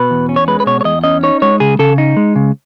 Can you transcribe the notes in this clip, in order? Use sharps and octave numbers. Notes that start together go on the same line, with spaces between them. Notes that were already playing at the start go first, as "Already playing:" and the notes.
Already playing: B2 B4
E2
C#4
C#5
G#3 B4
B4
B2 C#5
C#5
E2 D#5
C#4 D#5
D#4 C#5
G#3 C#5
C#3 G#4
C#3 A4
D#4
G#3
C#3